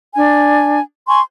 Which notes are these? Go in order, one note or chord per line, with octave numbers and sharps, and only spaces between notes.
D4 G#5
G#5 C6 C#6